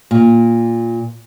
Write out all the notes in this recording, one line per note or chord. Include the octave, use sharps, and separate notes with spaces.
A#2